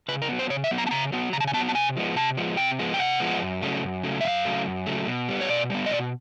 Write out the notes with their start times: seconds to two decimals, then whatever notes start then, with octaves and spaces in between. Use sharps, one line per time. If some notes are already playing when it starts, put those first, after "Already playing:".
0.08 C#3 B4
0.22 A#4
0.29 F#3 B3
0.39 C5
0.50 C#3 C#5
0.64 E5
0.71 F#3 B3
0.78 A#5
0.87 A5
0.91 C#3 A#5
1.12 F#3 B3
1.33 C#3 A#5
1.40 A5
1.47 G#5
1.53 F#3 B3 A5
1.69 A5
1.75 C3 G#5
1.96 F3 G#3 B3
2.16 C3 A5
2.37 F3 G#3 B3
2.57 C3 G5
2.79 F3 G#3 B3
2.94 G5
2.99 C3 F#5
3.20 F3 G#3 B3
3.42 F#2
3.61 C#3 F#3 A3
3.82 F#2
4.03 C#3 F#3 A3
4.21 E5
4.24 F#2 F5
4.45 C#3 F#3 A3
4.66 F#2
4.86 C#3 F#3 A3
5.07 B2
5.28 G3 B3
5.41 C#5
5.49 B2 D5
5.70 G3 B3
5.86 D#5
5.91 B2 D5